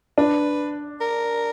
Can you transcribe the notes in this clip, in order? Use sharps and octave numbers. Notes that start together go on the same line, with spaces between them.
D4 B4
A#4